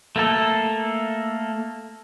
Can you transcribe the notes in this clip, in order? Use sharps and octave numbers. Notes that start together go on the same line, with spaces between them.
A3 A#3 A4